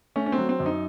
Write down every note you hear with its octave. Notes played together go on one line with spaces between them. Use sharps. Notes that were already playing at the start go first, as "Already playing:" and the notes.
A3 C#4
C#4
C4
F#3
C4
F#2
D#4